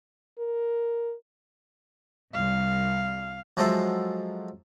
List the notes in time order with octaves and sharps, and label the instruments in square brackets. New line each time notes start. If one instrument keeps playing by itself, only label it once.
[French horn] A#4
[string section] C2 [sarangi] F5
[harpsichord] F3 F#3 G#3 A4 C5 E5